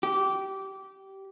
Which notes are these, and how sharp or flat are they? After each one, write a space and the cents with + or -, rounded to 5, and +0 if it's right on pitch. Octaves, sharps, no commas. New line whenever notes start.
G4 -20